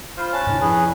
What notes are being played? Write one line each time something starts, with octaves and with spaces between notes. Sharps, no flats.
F4 C5 B5 F6
C#4 C#5 A5 F#6
G#2 C3 D4 E4 C#5
F2 F3 C#4 G#4 B4